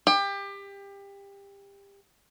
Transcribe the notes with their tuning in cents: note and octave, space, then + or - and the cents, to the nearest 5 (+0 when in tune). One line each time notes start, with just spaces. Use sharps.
G4 +25